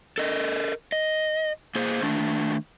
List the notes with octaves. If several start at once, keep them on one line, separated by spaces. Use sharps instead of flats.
A4 A#4 D#5
D#5
A#3 G#4 C5
D#3 A3 D4